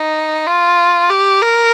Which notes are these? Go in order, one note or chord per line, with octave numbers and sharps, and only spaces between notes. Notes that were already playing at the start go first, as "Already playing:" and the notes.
Already playing: D#4
F4
G4
A#4